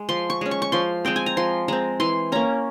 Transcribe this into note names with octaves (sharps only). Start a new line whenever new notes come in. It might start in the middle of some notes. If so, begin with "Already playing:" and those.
Already playing: G#3
F3 C6
C#6
G#3 C#4
C#6
C#6
F3 C6
G#3 C4 G5
G#5
A#5
F3 C6
G#3 C4 A#5
E3 C6
A#3 C#4 A#5